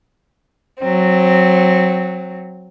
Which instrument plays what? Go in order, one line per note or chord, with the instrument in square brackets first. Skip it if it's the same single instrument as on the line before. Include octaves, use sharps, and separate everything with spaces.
[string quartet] F#3 C4